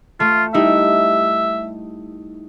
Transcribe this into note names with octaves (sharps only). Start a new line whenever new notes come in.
A3 F4
G3 D#4 E4 E5